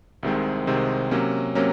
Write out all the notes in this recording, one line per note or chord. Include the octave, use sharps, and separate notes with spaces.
C2 C3 D#3 G#3 C4
C2 C3 D#3 G#3 C4
C3 F#3 A#3 C#4
C3 F#3 A#3 C#4